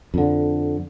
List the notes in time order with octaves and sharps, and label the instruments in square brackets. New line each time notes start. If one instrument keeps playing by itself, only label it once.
[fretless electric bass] F2 D3